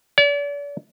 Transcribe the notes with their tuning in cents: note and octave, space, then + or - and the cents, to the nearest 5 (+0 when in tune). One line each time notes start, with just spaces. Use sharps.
D5 -40